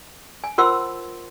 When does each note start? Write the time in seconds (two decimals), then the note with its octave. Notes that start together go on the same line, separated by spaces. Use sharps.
0.44 G#5
0.58 F4 A#4 C5 F#5 C6 E6